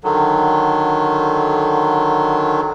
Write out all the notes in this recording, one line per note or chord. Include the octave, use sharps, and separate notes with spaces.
D3 D#3 F#3